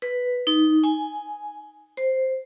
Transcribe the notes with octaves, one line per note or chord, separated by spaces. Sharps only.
B4
D#4
G#5
C5